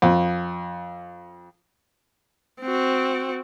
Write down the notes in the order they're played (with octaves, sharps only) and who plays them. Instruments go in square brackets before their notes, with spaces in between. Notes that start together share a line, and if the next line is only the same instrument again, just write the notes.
[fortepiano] F2
[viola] C4 F#4